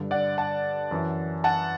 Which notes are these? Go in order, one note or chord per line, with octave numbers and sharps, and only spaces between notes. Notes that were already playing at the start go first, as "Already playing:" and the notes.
Already playing: G2 D3
D5 F#5
F#5 A5
F#2 E3
F#5 A5